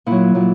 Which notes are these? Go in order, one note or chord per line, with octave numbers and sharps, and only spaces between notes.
A#2 F#3 E4
A#2 F#3